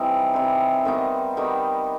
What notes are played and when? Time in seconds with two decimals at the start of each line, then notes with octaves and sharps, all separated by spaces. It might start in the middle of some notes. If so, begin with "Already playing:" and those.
Already playing: E3 G3 C4 D#4
0.34 E3 G3 C4 D#4
0.85 D#3 G3 B3 D#4
1.37 D#3 G3 B3 D#4